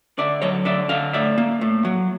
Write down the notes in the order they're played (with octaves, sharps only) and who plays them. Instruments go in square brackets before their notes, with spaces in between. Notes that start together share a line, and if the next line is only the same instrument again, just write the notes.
[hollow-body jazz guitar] D3 D5 E5
F#3 C#5 D#5
D3 D5 E5
D3 D#5 F5
A2 D5 E5
A#3
A2
F#3